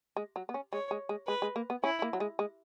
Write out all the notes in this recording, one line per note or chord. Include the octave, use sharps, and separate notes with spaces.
G#3
F#3
B3
C#4
G#3 C#5
G#3
G#3
G#3 B4
G#3
A#3
B3
C#4 E4
A#3
F#3
G#3
G#3